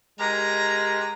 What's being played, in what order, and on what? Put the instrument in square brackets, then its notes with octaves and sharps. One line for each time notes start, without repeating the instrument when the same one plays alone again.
[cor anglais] G#3 [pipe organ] G4 A#4 [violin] A#5